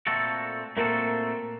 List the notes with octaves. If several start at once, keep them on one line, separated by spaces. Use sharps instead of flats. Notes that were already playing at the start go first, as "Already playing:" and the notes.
A#2 A3 C4 F#4 A4
A#2 A3 A#3 C4 F#4 A4